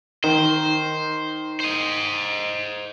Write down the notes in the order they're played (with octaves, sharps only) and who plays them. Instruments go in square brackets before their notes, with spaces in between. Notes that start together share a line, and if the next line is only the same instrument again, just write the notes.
[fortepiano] D#3 [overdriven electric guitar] C5
[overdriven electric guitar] C5 D#5